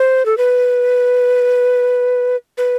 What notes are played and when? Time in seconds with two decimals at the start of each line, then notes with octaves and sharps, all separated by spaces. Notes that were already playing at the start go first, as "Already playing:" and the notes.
Already playing: C5
0.26 A4
0.38 B4
2.58 B4